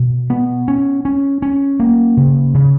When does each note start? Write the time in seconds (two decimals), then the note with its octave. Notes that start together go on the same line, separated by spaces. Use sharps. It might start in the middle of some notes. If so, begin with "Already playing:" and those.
Already playing: B2
0.30 B3
0.68 C#4
1.05 C#4
1.42 C#4
1.80 A#3
2.17 C#3
2.54 C#3